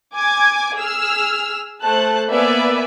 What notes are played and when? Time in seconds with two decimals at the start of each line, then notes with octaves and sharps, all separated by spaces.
0.14 G#5 D6 G#6
0.77 G#4 E6 F6
1.82 A3 C5 A5 F#6
2.30 A#3 B3 B4 D5 E5 G#5